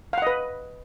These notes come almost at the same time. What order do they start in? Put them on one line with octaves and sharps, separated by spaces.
F5 F#5 D#5 B4